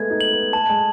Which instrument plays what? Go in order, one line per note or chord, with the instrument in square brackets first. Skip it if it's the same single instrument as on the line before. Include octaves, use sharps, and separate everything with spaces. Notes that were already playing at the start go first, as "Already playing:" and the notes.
Already playing: [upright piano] G#3 A3 B3 [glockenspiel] G#6
[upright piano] D#4
[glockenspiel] F#7
[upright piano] B3
[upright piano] A3 [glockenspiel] A5
[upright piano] G#3